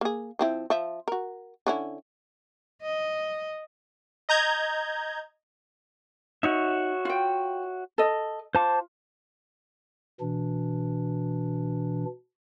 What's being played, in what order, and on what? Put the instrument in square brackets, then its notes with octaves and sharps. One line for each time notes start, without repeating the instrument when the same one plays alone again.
[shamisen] A#3 G#4
F3 C4 E4
F3 E5
F#4 A#4
D3 C#4 E4
[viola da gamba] D#5
[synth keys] D#5 A#5 G6 G#6
[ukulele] D#4 [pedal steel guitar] F#4 C#5 E5
[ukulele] F4 G5
A4 D#5
[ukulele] F4 [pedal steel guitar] C5 A5 D6
[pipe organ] B2 E3 D4